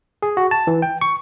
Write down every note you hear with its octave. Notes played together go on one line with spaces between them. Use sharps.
G#4
F#4
A5
E3
G5
C#6